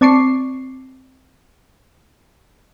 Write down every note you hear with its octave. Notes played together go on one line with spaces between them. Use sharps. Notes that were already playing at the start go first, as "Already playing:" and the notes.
C4 D5 A5 C#6 D6 C7